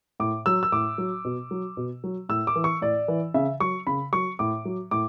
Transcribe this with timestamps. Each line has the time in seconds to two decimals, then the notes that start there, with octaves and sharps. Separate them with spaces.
0.20 A2 D6
0.46 F#3 E6
0.63 E6
0.72 A2 D6
0.98 F#3
1.25 B2
1.51 F#3
1.77 B2
2.04 F#3
2.29 A2 E6
2.47 D6
2.56 E3
2.64 C#6
2.81 A2 D5
3.08 E3
3.34 C#3 E5
3.60 F#3 C#6
3.87 C#3 B5
4.13 F#3 C#6
4.39 A2 D6
4.65 F#3
4.91 A2 D6